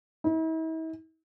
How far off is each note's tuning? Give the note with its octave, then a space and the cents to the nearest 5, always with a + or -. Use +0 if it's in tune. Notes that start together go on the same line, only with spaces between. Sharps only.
E4 -45